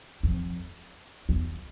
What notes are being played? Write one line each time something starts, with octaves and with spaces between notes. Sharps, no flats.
F2
E2